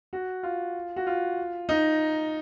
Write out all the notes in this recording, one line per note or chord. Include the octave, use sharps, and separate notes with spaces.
F#4
F4
F#4
F4
D#4